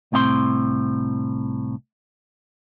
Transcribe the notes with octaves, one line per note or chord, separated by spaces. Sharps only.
C2 A2 C4 E5 C6